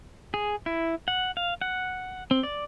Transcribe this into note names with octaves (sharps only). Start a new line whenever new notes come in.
G#4
E4
F#5
F5
F#5
C4
D5